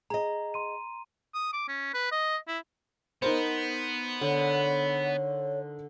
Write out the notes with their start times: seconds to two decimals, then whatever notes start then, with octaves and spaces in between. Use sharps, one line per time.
0.10 G#4 D#5 A#5
0.54 C6 D#7
1.34 D#6
1.53 D6
1.68 C#4
1.94 B4
2.12 D#5
2.48 E4
3.22 B3 D#4 A#4 C5
4.21 D3 C#5